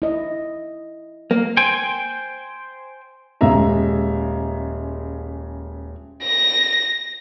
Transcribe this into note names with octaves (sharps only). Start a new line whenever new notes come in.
E4 D#5
A#3
C5 G5 G#5
D#1 C#3 G#3 E5 A#5
A#6